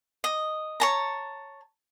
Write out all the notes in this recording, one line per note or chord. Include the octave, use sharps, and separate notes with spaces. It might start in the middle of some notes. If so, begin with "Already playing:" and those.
D#5
C#5 A5 A#5